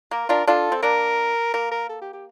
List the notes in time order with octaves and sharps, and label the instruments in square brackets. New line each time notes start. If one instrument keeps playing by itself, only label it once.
[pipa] A#3 [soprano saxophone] A#4
[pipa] D4 F4 [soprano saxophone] A#4
[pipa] D4 F4 [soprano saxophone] A4
[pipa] C4
[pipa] A#3 D4 [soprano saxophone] A#4
[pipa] A#3 [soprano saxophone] A#4
[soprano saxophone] A#4
A4
G4
G4